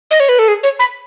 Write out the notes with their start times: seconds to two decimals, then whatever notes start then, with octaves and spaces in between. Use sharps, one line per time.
0.11 D#5
0.20 C#5
0.29 B4
0.39 A4
0.48 G#4
0.63 C#5
0.79 B5